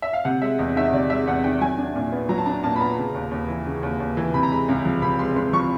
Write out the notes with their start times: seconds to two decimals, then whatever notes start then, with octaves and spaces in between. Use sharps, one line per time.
0.02 E5
0.13 F5
0.25 C3 F#5
0.42 G#3 E5
0.59 E2 D#5
0.76 D#3 E5
0.85 D#5
0.93 C3 D5
1.10 G#3 E5
1.27 E2 F#5
1.44 D#3 G5
1.61 F#3 G#5
1.78 D4
1.95 A#2
2.12 B3
2.29 F#3 A#5
2.38 A5
2.46 D4 A#5
2.63 A#2 A5
2.76 B5
2.80 B3 A#5
2.97 C#3
3.15 D#2
3.31 D#2
3.48 E3
3.66 C#3
3.83 D#2
4.00 D#2
4.17 E3
4.34 C3 B5
4.43 A#5
4.51 G#3 B5
4.69 C#2
4.85 F3
5.02 C3 B5
5.19 G#3 C6
5.36 C#2 C6
5.53 F3 C#6